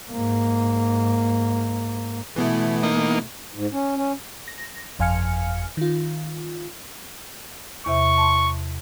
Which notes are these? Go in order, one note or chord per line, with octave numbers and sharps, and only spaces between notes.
G#2 A#3
B2 E3 A3 B3 E4
A#3 D#4
G#2
C#4
C#4
A#6
G1 F2 F5 G#5 F6 C#7
D#3 F4
E2 C3 E5 C#6
A5 C6